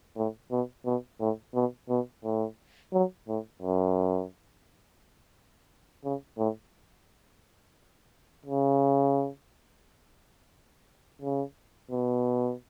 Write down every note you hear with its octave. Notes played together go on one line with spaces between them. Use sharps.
A2
B2
B2
A2
B2
B2
A2
F#3
A2
F#2
C#3
A2
C#3
C#3
B2